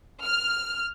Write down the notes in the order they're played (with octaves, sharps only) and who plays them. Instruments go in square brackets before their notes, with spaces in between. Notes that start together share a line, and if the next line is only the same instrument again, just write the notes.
[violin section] F6